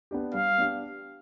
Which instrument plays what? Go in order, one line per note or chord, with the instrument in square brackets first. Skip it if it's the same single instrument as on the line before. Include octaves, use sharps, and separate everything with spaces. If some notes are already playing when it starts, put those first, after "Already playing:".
[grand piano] B3 D4 G4
[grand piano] G3 [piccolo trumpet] F5
[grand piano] B3 D4 G4